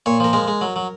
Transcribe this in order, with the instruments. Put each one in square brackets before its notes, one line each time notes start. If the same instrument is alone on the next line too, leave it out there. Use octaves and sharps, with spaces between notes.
[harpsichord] A#2 C#5
F3 A#4
G#3 A#4
G#3
F#3
F#3